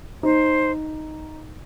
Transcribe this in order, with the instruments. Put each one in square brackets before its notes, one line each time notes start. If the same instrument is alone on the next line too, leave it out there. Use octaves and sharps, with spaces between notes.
[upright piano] D#4 [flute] C5